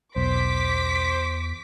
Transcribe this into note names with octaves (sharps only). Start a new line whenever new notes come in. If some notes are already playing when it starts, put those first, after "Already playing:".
B1 E2 C5 D6 B6